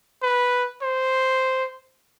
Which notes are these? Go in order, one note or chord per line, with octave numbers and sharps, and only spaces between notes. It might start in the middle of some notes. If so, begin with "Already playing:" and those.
B4
C5